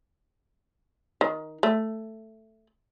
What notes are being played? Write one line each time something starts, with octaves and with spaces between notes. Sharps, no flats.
D#3
A3